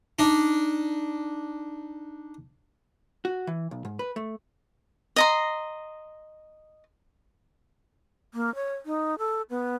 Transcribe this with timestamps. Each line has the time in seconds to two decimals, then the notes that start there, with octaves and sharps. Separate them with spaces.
0.19 D4 D#4
3.25 F#4
3.47 E3
3.71 B1
3.85 G#2
3.99 B4
4.16 A3
5.16 D#5 A#5 C6
8.33 A#3
8.55 C#5
8.86 D#4
9.18 A4
9.50 B3